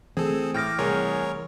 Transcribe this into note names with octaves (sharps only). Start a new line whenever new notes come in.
E3 A3 C4 G#4 A4
A2 G5 D6 F6 A#6
C2 G#4 A#4 C#5 G#5